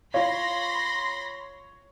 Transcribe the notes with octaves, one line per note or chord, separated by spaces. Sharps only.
F4 C#5 F5 B5 C6 A#6